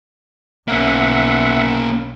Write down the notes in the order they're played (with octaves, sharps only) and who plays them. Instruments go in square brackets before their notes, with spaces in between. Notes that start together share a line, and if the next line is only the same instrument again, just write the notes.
[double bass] B1 [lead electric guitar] A#3 C#4 [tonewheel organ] E5 F#5